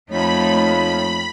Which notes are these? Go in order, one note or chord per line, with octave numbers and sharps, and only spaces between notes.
F2 A3 A#3 D#4 C#5 B5